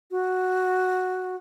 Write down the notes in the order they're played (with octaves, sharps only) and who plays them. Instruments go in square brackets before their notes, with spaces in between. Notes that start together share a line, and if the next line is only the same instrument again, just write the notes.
[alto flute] F#4